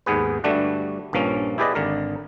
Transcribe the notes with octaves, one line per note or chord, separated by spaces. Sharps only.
D#2 G#2 B3 G#4 B4
G2 D3 G3 A3 D4 F#4
A#1 G2 F3 A#3 C#4
E4 G4 G#4 B4 D5 D#5
G#1 D3 A#4